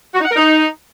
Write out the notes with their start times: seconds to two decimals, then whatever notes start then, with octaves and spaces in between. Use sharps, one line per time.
0.15 F#4
0.20 D#4
0.25 F#5
0.31 A#4
0.36 D#4